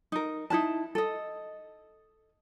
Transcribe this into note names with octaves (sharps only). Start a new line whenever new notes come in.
D#4 A#4
D#4 E4 B4 A5
A4 D#5